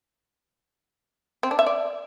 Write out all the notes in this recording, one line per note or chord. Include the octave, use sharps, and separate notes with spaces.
C4
D4
E5
D5